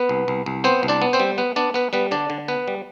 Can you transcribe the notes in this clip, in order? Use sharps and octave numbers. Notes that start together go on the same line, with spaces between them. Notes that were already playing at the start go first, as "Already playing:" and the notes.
Already playing: B3 B4
C2
C2
C2
B3 C4 C5
C2
D4 D5
B3
C4 C5
G3
B3 B4
B3 D4 D5
B3 B4
G3 B3 B4
D3 D4 D5
D3
B3 B4
G3